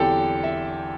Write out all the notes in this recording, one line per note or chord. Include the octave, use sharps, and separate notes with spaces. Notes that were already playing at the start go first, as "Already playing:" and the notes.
Already playing: E2 D3 F#3 C4 E4 G4 A4
E5